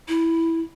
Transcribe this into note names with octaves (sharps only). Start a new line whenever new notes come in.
E4